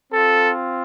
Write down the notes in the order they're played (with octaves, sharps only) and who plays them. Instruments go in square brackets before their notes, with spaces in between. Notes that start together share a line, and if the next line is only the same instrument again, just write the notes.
[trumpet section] C4 F4 A4